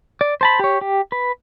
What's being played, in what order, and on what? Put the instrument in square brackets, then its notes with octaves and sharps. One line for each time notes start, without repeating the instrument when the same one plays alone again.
[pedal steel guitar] D5
C5 A5 B5
G4 C#5
G4
B4